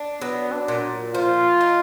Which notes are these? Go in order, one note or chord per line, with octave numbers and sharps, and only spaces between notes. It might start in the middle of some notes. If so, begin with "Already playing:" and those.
Already playing: D4
F#3 B3
D4
A#2
F3 F4
D#4